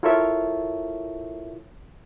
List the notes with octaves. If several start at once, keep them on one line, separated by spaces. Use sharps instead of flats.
E4 F4 A4 A#4 C#5 E5